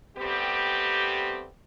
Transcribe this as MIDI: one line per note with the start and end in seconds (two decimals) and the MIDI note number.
0.17 1.47 55
0.17 1.47 57
0.17 1.47 59
0.17 1.47 60
0.17 1.47 67